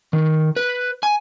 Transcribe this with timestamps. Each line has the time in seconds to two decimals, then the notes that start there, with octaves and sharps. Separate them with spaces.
0.13 D#3
0.56 B4
1.03 G#5